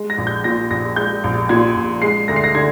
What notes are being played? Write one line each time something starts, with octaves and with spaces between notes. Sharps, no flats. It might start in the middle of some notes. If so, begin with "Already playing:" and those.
Already playing: G#3
A#6
A#1
G6
A#2 A#6
A#1 A#6
G#3 G6
A#1
A#2 G#6
A#1
G#3 C7
D2 A#6
C7
A#6
D3 G#6